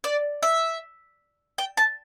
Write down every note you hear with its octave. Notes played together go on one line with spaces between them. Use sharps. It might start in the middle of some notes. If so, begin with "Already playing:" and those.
D5
E5
G5
A5